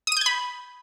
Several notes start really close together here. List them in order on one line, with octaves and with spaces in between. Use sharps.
D#6 D#7 G6 G#6 B5